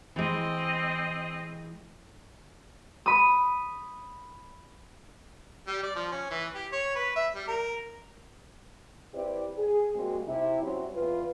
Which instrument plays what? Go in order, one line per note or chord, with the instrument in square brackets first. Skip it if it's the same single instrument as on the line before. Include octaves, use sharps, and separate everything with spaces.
[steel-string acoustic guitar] E3 G#3 [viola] C4 D#5
[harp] B5 D#6
[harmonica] G3
D5
F3
C#4
E3
G4
C#5
B4
E5
G3
A#4
[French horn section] C4 E4 G4 B4 D5
G#4
G3 G#3 A#3 C4 F#4
C3 E4
F#3 G3 C4 C#4 E4
E2 F4 B4